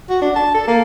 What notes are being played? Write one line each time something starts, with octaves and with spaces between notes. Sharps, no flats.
F#4
D4
A5
A4
A#3